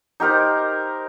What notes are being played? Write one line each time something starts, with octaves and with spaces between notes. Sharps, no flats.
D#4 G4 A#4 C5